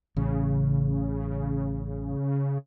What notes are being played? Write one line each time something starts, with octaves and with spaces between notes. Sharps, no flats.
A1 C#3